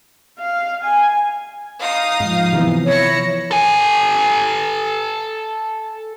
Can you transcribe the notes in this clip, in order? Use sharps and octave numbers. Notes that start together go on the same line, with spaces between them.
F5
G#5
D#4 F5 D#6
G#2 F3
C3 E3 B3
E4 C#5 A#6 C#7
A4 G#5